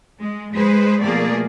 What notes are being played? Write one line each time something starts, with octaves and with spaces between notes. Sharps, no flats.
G#3
G#3 G#4 B4 C5
B2 F3 A3 A#3 G#4 D5